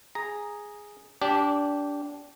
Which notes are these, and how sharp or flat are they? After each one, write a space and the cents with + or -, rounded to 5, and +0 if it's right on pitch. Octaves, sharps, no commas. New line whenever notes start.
G#4 +0 A#5 +0
D4 -20 G4 +0